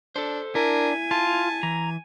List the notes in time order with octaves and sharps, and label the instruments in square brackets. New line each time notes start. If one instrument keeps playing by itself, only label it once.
[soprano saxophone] D4 [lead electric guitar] A4 C5
[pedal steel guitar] D4 [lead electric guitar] E4 [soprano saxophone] A#4 [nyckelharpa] G#5
[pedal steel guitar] F4 [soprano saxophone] A5
[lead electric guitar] E3 [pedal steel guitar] A#5